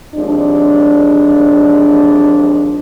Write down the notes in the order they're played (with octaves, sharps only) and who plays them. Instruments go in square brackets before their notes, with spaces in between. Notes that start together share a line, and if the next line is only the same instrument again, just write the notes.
[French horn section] D#2 C3 F3 G#3 D4